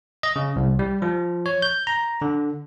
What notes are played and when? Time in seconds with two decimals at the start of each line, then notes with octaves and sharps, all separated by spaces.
0.23 D#5
0.36 C#3
0.56 C2
0.79 G3
1.02 F3
1.46 C#5
1.62 G6
1.87 A#5
2.22 D3